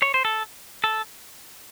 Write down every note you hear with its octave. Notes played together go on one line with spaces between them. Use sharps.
C#5
C5
A4
A4